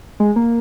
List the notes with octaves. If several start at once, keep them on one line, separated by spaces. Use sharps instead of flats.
G#3
A#3